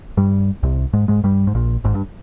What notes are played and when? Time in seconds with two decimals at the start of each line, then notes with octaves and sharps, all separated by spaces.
0.17 G2 G3
0.63 C2 C3
0.93 G#2 G#3
1.08 G#2 G#3
1.24 G2 G3
1.47 G#2
1.55 A#1 A#2
1.84 G#1 G#2
1.94 G2